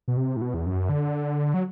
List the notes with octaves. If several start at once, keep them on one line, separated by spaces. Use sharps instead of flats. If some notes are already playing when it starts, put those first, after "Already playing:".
B2
C3
A2
B2
E2
F#2
D3
F#3